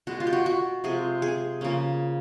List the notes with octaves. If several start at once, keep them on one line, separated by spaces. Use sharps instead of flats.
B2 G#3 B3 F#4
F4
G4
F#4
F#4
C3 F3 G#3 G#4
G#4
C#3 F3 A#3 C#4